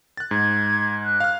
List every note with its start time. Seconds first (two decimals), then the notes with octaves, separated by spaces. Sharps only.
0.17 F#6 A6
0.31 G#2 G#6
1.04 F#6
1.20 F5 F6